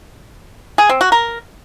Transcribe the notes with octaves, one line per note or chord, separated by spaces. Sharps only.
G#4
C4
F#4
A#4